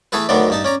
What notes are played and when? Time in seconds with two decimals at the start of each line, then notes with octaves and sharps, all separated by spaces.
0.12 E3 A3 G#4 A4 B4
0.29 D2 B2 D#3 F#3 B3 D5
0.50 G2 D#4 A5
0.64 C#4 D5 A#5